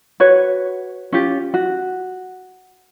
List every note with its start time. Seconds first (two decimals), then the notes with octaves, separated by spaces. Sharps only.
0.20 F#4 B4 C#5
1.12 C#4 F4 G4
1.54 F#4